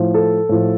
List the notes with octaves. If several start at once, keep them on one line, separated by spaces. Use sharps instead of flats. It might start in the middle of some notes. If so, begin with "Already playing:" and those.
Already playing: A2 F3
A4
A2 F3